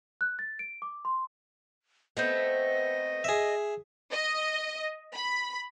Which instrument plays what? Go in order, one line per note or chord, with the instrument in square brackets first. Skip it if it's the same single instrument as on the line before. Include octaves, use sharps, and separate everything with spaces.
[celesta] F#6
A6
D7
D6
C6
[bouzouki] A3 B3 C4 [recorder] D#5
[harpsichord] G#4 E5
[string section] D#5
B5